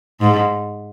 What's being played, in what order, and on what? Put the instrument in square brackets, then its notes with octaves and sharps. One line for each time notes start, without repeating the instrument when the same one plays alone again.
[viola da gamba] G#2